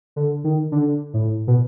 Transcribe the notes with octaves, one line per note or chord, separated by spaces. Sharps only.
D3
D#3
D3
A2
B2